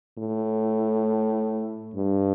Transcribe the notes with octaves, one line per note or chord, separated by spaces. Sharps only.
A2
G2